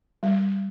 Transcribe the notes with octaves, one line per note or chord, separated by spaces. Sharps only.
G3